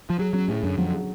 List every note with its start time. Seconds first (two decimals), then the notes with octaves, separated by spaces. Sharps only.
0.10 F3
0.19 F#3 G#4
0.33 F#3 C#4
0.48 A2 G#4
0.63 F#2 D3
0.78 F2 F#3
0.93 G#4